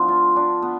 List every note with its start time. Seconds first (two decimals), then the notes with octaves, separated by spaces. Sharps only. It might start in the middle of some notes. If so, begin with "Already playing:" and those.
Already playing: F3 B3 D4
0.08 F4
0.36 D4
0.62 B3